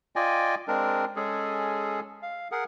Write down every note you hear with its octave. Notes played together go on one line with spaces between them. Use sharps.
F4 D5 D#5 G5 G#5
G#3 C4 D4 A#4
G#3 C#4 G#4 A4
F5
G#4 A#4 F#5